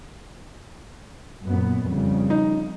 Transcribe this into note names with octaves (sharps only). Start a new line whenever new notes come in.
F#2 A#2 B3
F2 C#3 G3
D#4